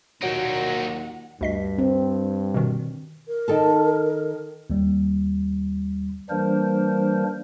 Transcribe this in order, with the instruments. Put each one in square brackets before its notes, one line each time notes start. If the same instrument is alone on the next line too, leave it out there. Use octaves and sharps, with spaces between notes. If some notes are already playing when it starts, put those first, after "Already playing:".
[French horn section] D#2 A#2 [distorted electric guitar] F#3 D#4 [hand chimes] F#4 C#5 D7 [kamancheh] F#5
[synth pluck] D2 D#5 B6 [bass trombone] G2
[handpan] C4
[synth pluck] B2 D#3
[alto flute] A#4
[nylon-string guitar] D#3 A4 A5
[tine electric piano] D#2 G3
[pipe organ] E3 G3 A#3 D4 A#4 C5